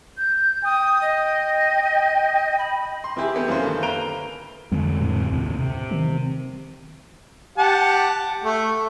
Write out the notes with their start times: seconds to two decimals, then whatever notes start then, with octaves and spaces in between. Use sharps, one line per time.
0.17 G6
0.64 G5 D#6
1.01 D#5
2.59 B5
3.04 C6
3.16 C3 E3 E4 G4 G#4
3.35 A3 B3 G4
3.48 F#2 E3 A#3 C5
3.64 D3 D#3
3.83 A#3 B4 A#5 D7 F7 G7
4.72 F2 D3 G#3 C4
4.99 A2
5.32 D#2 C3
5.60 C3
5.91 D#3
7.58 G4 F#5 A5
8.44 A3